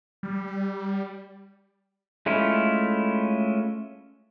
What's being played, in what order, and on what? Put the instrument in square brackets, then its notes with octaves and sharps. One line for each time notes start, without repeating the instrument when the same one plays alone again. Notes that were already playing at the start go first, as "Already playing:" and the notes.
[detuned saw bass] G3
[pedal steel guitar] G#3 A3 C#4 E4 F4